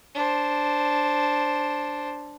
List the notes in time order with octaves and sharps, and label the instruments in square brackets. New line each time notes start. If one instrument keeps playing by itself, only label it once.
[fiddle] D4 C5